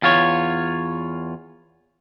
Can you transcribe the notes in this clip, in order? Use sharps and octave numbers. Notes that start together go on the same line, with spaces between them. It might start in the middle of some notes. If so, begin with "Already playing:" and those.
E2 F4 C#5